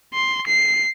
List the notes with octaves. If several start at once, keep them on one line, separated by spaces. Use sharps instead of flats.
C6
C7